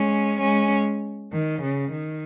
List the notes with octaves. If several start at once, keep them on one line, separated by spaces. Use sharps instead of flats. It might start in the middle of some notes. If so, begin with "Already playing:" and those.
Already playing: G#3 C#4
G#3 C#4
D#3
C#3
D#3